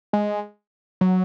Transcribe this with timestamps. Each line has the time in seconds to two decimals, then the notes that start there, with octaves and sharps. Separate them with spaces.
0.13 G#3
1.01 F#3